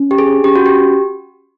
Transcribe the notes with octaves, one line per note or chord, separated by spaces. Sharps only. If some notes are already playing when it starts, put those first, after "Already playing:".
Already playing: C#4
G4
G#4
C#4 G4
F#4
G4